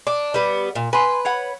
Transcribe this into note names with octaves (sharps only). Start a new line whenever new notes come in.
D4 D6
G3 B3
A#2
B4 G#5 C6
C#5 F#5 B5